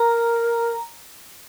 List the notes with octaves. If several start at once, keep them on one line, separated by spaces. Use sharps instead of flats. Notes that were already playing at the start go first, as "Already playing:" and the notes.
Already playing: A#4 A#5